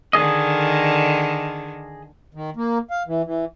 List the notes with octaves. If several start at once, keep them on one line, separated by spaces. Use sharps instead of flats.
D3 D#3 G#4 D#5
D#3
A#3
F5
E3
E3